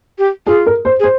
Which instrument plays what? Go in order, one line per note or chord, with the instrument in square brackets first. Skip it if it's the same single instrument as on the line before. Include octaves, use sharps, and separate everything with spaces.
[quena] G4
[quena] F4 [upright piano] G#4
[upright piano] A#4
C5
[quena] G#4
[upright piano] C5